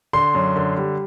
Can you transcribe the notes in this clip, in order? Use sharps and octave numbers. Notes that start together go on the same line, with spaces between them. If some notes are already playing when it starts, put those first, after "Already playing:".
D3 C6
F#2
D3
G3